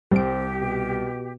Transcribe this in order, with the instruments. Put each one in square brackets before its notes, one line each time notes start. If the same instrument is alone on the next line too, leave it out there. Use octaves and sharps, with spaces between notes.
[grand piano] C2 [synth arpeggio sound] G3 D7 [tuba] C4 [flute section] G4
[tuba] B2